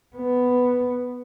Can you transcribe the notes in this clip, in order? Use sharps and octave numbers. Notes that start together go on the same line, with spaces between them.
B3